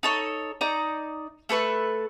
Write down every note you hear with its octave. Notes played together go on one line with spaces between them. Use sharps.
D#4 A4 C#5
D#4 D5 A#5
A3 A4 B4 C#6